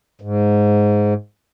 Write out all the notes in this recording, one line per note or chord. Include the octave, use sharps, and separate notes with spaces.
G#2